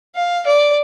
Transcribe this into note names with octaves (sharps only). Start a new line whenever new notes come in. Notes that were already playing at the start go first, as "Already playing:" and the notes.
F5
D5